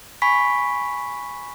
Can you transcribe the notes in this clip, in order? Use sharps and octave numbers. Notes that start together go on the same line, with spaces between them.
G#5 B5 C#6 B6